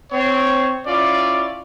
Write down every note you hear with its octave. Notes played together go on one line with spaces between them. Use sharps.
C4 C#5
C#4 E4 F4 D5